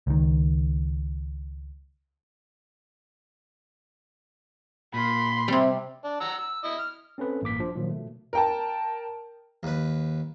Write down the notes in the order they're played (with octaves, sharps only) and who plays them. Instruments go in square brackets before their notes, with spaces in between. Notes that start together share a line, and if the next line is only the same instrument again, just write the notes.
[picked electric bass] C#2 D#3
[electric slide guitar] A#2 [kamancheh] B5 C6
[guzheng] C3 G3 [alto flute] C4
[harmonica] D4
F#5 A#5 E6
E6
E4 D#5
F6
[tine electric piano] C4 C#4 A4 B4
A1 G2 A#3 D6 B6
F3 D4
A#2 D#3 F3 F#3
B2 A3
[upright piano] A#4 G5 A5
[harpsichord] D#2 B4